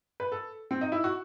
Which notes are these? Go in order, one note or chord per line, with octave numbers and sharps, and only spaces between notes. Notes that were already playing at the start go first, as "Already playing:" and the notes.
B4
A4
C4
D#4
E4
F#4